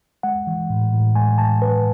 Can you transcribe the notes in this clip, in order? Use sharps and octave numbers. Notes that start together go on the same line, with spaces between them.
G#3 F#5
E3
A2
A2
G#3 G#5
E3 A5
A2 B4